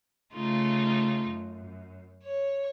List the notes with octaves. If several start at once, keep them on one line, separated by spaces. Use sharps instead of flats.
C#3 A3 D#4 F4
F#2
C#5